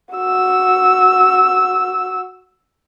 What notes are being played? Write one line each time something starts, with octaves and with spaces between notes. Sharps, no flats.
F#4 E6